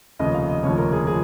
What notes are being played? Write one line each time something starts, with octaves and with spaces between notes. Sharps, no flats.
F1 D#2 C#3 F3 D#5
F5
D#5
F1 D#2 C#3 F3 C#5
A#4
G#4
F3 G#4